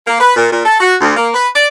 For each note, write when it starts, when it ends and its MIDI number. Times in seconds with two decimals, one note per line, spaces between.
0.07 0.20 58
0.20 0.33 71
0.36 0.49 46
0.51 0.61 46
0.65 0.76 69
0.80 0.95 66
1.01 1.12 38
1.15 1.29 58
1.34 1.48 71
1.55 1.67 74